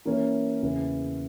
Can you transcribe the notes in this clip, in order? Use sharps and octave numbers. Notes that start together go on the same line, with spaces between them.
E3 A#3 C#4 E4 A#4
E2 C#3 E3